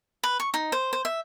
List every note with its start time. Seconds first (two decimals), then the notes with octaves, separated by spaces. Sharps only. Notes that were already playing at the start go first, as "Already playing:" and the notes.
0.23 B4
0.40 C#6
0.54 D#4
0.72 C5
0.93 C5
1.05 E5